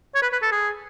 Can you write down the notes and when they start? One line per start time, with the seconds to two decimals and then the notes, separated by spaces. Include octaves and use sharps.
0.15 C#5
0.22 B4
0.32 B4
0.42 A4
0.52 G#4